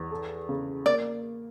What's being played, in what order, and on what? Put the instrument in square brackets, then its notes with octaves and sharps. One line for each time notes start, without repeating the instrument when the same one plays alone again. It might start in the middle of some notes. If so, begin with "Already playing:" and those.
Already playing: [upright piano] E2
A4
C#3
[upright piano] A#3 [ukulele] D5